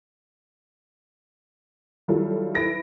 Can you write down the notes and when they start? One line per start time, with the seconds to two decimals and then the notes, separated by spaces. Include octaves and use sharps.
2.08 D#3 F#3 G3 E4 F4 A4
2.55 E4 B4 A#6 D7